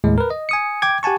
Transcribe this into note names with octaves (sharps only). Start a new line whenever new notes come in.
D#2 A2 G#3
A#4 B4
D#5
G#5 D#6 C#7
G5 D6 G#6
G4 F#5 G#5 A5 C#6